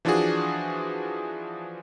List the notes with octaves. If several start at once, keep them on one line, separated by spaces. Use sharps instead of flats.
E3 F3 D4 F4 F#4 G#4